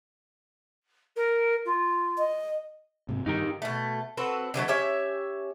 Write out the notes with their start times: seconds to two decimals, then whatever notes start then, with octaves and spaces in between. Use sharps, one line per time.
1.16 A#4
1.65 F4
2.18 D#5
3.09 G#2 C3
3.26 G2 D#3 D#4 G4 A#4
3.62 B2 A3
4.17 C4 F#4 A4 B4
4.54 D3 E3 F#3 A3
4.68 C#4 G4 C#5 E5